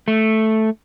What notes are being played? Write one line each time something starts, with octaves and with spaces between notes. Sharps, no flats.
A3